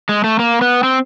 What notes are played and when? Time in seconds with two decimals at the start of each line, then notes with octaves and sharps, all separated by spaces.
0.09 G#3
0.24 A3
0.39 A#3
0.61 B3
0.83 C4